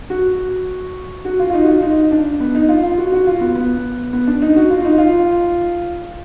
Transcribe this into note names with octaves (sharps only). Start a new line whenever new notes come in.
F#4
F#4
F4
F4
D#4
F#4
F4
D#4
D4
B3
D#4
F4
F4
F#4
F#4
F4
B3
B3
B3
D4
D#4
F#4
F4
D#4
F4